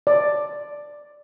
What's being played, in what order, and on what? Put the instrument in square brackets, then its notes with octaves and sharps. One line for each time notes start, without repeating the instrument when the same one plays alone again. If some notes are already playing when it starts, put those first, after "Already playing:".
[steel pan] D5